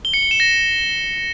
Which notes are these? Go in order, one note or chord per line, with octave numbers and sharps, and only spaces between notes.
G7
C#7
G7
E7
A#6